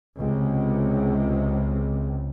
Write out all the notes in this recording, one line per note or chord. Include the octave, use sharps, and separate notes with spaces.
C#2 C3